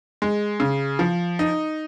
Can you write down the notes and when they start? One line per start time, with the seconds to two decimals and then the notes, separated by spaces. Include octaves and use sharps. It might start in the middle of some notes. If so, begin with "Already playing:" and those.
0.22 G#3
0.60 C#3
0.99 F3
1.39 D#4